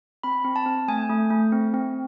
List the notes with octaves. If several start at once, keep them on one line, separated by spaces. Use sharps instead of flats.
C4 B5
C4
A5
C4
A3 G#5
A3
A3
C4
C4